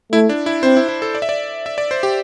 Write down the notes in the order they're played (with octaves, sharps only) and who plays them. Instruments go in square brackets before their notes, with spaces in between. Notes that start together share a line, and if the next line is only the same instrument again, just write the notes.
[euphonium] A3 [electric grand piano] E4
[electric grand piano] D4
E4
[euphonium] C4 [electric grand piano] C5
[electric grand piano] E4
E4
A4
D5
E5
D5
E5
D5
C5
G4